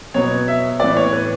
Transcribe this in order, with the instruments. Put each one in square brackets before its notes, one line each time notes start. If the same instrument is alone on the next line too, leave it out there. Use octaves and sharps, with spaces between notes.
[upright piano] B2 F#3 B3 C#5
E5
A2 E3 B3 D5
C#5
B4